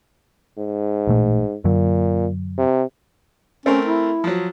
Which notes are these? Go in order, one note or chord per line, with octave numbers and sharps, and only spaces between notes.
G#2
A1 A#2 A3
F#2 A#2 D3 F#3
C3
A3 C4 C#4 A#4
E4
F3 F#3